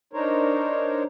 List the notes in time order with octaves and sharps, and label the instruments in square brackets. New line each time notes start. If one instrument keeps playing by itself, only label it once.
[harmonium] D4 D#4 A#4 C5 C#5